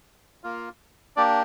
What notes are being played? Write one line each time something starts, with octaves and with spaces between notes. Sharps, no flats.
A#3 F4
A#3 D4 G4 D5